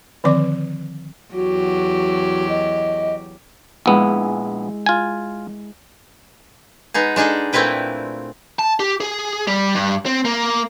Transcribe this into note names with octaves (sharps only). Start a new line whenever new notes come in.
D3 D#3 F3 C4 D5 D6
E2 F#3 F#4 G4
D#5
A#1 G#3 B3 E4
F4 G#5
G#3 B3 D#4 G#4
G#3 D4 D#4 G#4 A4
A#2 A3 C4 E4 B4 G5
A5
G4
G#4
G3
G2
C4
A#3